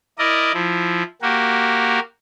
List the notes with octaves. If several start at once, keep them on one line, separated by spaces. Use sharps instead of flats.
E4 A#4 D5 D#5
F3 E4
A#3 F#4 G4 A#4